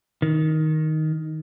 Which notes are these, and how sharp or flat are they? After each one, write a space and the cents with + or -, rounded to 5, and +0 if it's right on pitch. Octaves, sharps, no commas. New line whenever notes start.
D#3 +5